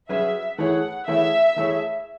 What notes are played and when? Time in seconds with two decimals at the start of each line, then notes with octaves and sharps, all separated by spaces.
0.09 F#3 C#4 G#4 B4 E5
0.58 E3 A3 E4 G#4 C#5 F#5
1.07 E3 A3 E4 G#4 C#5 E5
1.56 E3 A3 E4 G#4 C#5